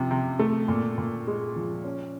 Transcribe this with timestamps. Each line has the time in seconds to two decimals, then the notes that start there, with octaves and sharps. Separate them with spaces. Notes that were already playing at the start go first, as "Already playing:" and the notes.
Already playing: C3 F3
0.11 C3
0.39 A3
0.68 A#2
0.98 A#2
1.27 G#3
1.56 F3
1.84 C#4